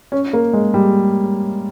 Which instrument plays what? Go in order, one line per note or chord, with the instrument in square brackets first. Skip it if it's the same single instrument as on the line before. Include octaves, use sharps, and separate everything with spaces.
[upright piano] C#4
A#3
G#3
G3